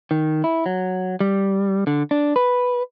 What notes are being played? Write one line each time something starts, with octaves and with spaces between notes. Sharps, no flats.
D#3
E4
F#3
G3
D3
D4
B4